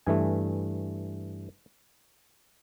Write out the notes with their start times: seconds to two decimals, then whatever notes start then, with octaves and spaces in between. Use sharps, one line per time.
0.07 G2 E3 A3 G#5